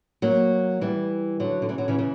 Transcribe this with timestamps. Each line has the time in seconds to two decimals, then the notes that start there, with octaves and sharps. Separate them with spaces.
0.22 F#3 A#3
0.81 E3 G3
1.40 D3 F#3
1.62 D3
1.69 C#3 E3
1.78 D3 F#3
1.88 C#3 E3
1.99 C#3 E3